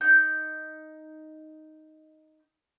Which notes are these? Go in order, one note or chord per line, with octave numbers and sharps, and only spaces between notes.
D#4 G6